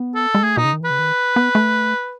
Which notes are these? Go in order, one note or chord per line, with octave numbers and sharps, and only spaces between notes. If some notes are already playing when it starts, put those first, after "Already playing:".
Already playing: B3
A4
G#3
A3 G#4
B2 D#4
C#3
D#3
E3 B4
C#3
D#3
B3
A3